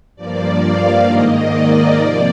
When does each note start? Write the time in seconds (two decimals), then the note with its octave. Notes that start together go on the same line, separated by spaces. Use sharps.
0.16 G2 F3 A#3 D5
0.61 F5
1.05 G#2 D#3 A#3 D#5
1.50 D5
1.94 C3 F3 A#3